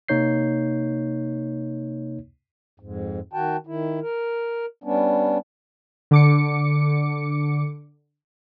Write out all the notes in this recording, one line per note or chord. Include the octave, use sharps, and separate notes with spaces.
C3 A#3 D#4 C#5 G6 C7
F2 G#2
D#3 F#4 G5 A5
D#3 E4
A#4
G3 B3 C#4 D4
D3 D6 C#7